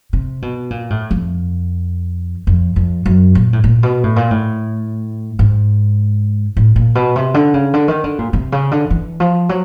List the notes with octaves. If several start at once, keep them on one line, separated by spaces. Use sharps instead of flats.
C3
B2
A#2
A2
F2
F2
F2
F#2
A#2
A2
A#2
B2
A2
A#2
A2
G#2
A2
A#2
B2
C3
D3
C#3
D3
D#3
D3
A#2
C3
C#3
D3
E3
F3
F#3